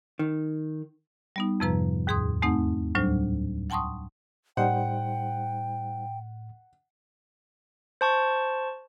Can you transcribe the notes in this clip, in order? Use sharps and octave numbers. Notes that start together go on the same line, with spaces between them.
D#3
G3 B3 D#4
F2 G#2 C3 F3 B4 A#5
D#2 G#2 G#4 C6 D#6
E2 A3 C4 D#4 F#5
D2 A2 F#3 G3 D4 C5
F#5 G5 A5 C6 C#6 D#6
A2 G3 D#4 C5 F#5 G5
C5 A5 C#6